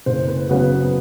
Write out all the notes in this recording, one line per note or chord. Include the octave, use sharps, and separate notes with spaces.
F#1 C5
B4
C#3 F#3 B3 B4